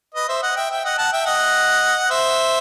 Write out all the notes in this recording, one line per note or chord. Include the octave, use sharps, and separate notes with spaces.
B4 D#5
C5 E5
D#5 F#5
E5 G5
E5 G5
D#5 F#5
F#5 A5
E5 G5
D#5 F#5
C5 E5